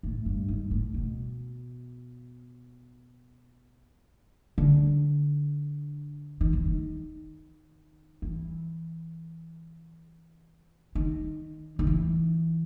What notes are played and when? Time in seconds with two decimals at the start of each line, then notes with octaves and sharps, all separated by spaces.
0.03 A2
0.26 G2
0.48 G#2
0.71 A2
0.94 B2
4.58 D3
6.41 D#3
6.53 E3
6.66 D#3
8.22 E3
10.95 D#3
11.79 D#3
11.87 E3